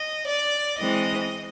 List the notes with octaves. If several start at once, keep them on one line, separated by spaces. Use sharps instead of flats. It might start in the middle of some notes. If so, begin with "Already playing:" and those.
Already playing: D#5
D5
E3 G#3 C4 D#5